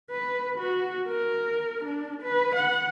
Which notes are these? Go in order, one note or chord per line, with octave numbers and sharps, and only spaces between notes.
B4
F#4
A#4
D4
B4
F#5